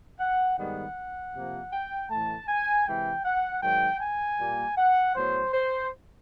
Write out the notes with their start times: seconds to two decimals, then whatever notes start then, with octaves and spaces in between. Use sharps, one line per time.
0.20 F#5
0.58 G#2 D#3 G3 B3 F#5
1.34 C3 F3 A#3
1.72 G5
2.10 A2 E3 A3 A5
2.48 G#5
2.86 C3 E3 G#3 G5
3.25 F#5
3.63 G#2 D#3 F#3 G5
4.01 G#5
4.39 A#2 G3 A#3
4.77 F#5
5.16 A2 F#3 B3 C5
5.53 C5